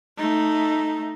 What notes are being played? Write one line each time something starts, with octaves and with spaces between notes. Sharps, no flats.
A3 D#4